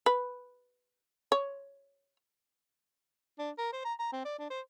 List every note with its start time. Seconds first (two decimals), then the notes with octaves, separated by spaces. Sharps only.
0.06 B4
1.32 C#5
3.39 D4
3.58 A#4
3.73 C5
3.85 A#5
3.99 A#5
4.13 C4
4.25 D5
4.39 D4
4.50 C5